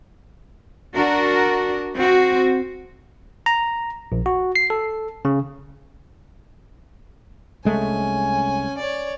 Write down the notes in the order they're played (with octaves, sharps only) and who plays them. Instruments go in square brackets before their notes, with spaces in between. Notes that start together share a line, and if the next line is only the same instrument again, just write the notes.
[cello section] D4 F#4 A#4
C4 F#4
[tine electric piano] A#5
A#1
F#4
C7
A4
C#3
[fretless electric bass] C2 G#3 A3 [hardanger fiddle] C#4 G#5
[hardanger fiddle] C#5 D5